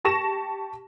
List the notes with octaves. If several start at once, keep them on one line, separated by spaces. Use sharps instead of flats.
G4 A5 C#6 A#6 E7